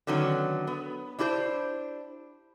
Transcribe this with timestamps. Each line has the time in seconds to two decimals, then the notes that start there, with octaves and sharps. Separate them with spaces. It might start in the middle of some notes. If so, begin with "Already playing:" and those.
0.07 D3 D#3 F#3 B3 C#4
0.67 B3
1.19 D4 E4 G4 A4 C5